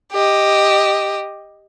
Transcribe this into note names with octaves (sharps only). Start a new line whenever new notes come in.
G4 D#5